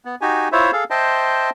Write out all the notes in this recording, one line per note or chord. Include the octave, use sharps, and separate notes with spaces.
B3
D#4 F#4 G4 G#5
E4 F4 C5 C#5 E5
G#4 A4 F5
C5 D#5 E5 G5 A5 C6